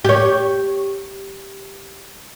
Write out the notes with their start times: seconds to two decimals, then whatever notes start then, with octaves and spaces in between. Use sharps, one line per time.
0.05 G4 C#5